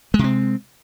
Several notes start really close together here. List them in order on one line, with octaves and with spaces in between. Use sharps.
G#3 C3 C4